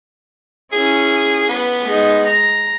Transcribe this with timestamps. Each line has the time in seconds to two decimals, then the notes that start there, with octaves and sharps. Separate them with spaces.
0.73 C#4 E4 G#4
1.49 B3 B4
1.85 G#3 D#4
2.27 A#5